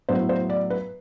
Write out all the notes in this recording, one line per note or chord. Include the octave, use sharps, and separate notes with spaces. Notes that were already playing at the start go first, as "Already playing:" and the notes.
A2 F#3 B3 E4 C5
C5
D5
B4